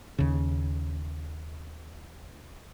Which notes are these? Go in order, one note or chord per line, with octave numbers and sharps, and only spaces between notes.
D#2 C#3